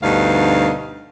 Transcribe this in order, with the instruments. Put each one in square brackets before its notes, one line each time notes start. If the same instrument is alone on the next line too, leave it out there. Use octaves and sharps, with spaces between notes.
[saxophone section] D2 G2 B2 D#4 F5